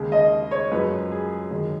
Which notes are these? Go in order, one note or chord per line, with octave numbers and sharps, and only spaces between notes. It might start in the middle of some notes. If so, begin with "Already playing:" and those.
Already playing: D#2 C#3 G#3
D#5
C#5
F#2 F3 G#3 B4
G#4
F#2 D#3 G#3